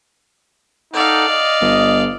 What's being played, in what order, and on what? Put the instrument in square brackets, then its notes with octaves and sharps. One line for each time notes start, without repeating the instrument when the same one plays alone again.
[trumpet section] D#4 A4 F#5 [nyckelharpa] D5 F5
[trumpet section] D#5
[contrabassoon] G1